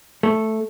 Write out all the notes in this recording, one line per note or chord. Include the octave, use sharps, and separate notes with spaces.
A3